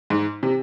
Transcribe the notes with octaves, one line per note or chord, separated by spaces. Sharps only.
G#2
C3